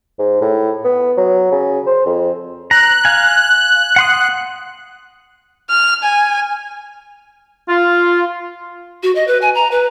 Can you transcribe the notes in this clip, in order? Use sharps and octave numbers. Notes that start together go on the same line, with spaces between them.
G#2
A2
B3
F#3
C#3
C5
F2
A#5 F#6
F5 G#5
F#5 C6 D#6
F6
G#5
F4
F#4
D#5
B4
G#5
A#5
B4